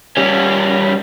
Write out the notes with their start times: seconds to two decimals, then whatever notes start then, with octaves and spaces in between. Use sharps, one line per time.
0.17 G3 C#4